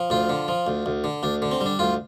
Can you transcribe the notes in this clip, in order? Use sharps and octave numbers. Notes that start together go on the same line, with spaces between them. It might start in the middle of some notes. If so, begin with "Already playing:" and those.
Already playing: F3
D2 F4
D3
F3
D2
D2
D3
D2 D4
D3
C4
G3
D4
D2 F4